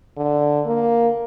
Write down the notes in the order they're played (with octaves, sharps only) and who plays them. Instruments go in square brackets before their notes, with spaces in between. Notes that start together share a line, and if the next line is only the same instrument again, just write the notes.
[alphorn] D3
A#3